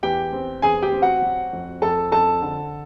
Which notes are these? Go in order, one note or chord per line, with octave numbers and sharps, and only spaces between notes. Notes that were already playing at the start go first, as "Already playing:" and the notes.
E2 G4 G5
C4
E2 G#4 G#5
G4 G5
C4
F#4 F#5
F#3
F2
F2 A4 A5
F2 A4 A5
D3